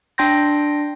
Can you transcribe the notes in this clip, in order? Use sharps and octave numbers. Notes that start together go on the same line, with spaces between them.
D4 G5 C6 G6 A#6